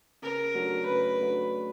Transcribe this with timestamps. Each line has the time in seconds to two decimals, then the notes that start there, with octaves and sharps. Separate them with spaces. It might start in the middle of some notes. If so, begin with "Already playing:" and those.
0.22 C#3 A#4
0.54 F#3 A3 D4 F#4
0.86 C#3 B4
1.19 F#3 A3 D4 F#4